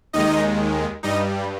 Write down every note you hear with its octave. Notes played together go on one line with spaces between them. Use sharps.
D#2 D#3 G#3 D#4 D#5
G2 G3 D#4 D#5